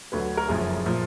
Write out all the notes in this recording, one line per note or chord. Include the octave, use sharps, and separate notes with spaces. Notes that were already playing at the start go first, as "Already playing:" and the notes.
D2 D3 F#3 B4
A#4
F#1 F#2 F3 G#4
A#2 F3